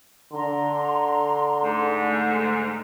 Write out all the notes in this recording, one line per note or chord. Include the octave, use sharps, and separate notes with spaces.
D3 A#5 C6
G#2 A3